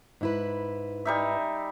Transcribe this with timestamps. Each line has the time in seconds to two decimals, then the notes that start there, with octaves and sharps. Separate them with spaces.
0.21 G#2 E4 B4
1.05 G3 D#4 E5